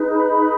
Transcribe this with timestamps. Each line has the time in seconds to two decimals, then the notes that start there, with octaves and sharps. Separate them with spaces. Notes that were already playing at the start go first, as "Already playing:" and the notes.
Already playing: D#4 G#4 B4
0.14 B5